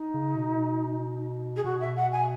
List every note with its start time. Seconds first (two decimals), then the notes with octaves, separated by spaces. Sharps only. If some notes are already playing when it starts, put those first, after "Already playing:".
Already playing: D#4
0.14 C#3
0.35 B2
1.56 G#4
1.64 B2 F#4
1.80 E5
1.96 F#5
2.12 G#5